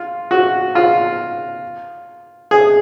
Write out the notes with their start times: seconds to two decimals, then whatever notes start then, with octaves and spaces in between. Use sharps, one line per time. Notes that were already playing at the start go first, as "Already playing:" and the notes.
Already playing: F4
0.31 F#4
0.75 F4
2.51 G#4